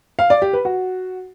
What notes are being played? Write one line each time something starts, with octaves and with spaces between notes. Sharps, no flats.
F5
D5
G4
B4
F#4